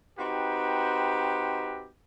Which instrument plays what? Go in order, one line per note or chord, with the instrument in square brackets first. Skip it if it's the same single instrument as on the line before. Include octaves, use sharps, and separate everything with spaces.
[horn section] C4 D#4 F#4 G4 B4